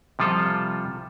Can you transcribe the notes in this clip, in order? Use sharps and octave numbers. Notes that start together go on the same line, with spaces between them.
C3 F3 G3 F4 A4